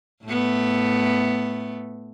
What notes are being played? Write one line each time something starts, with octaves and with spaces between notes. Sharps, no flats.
A2 A3 B3